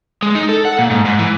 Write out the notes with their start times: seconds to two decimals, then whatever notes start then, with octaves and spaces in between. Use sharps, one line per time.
0.23 G#3
0.35 D#4
0.49 A4
0.65 F#5
0.78 A#2
0.91 G#2
1.05 G#2
1.19 E3